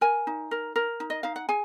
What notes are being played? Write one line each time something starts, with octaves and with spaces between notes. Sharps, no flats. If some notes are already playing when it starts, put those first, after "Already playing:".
A#4 G#5
D#4
A#4
A#4
D#4
D#5
D#4 F5
F#5
G#4 G#5